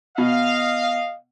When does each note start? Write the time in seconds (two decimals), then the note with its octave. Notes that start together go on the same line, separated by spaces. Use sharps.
0.18 B2 D#5 F5